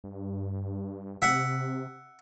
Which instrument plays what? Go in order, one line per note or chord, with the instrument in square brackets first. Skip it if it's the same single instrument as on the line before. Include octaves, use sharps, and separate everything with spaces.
[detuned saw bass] G2
[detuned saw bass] C3 [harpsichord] E5 F#5